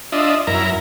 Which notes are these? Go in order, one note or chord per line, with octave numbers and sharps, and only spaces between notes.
D4 F4 D#5 E5
F#2 E4 A#4 A#5